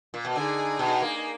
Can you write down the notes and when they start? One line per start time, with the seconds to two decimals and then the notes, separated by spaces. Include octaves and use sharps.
0.14 A#2
0.25 B2
0.36 D3 D#4 G#4 D5 G#5
0.79 B2
1.02 A#3